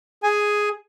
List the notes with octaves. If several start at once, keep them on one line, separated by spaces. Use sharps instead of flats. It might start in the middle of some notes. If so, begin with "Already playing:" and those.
G#4 G#5